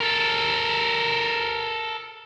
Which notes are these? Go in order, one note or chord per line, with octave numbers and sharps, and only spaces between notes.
A4 A#4